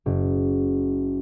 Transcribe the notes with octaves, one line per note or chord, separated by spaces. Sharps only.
F#1